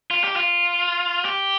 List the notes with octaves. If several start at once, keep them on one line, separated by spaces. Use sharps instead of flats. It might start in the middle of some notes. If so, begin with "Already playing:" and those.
F4
G4
F4
G4